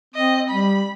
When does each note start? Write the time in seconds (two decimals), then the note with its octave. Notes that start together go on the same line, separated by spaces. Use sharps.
0.15 C4 D#5
0.49 G3 B5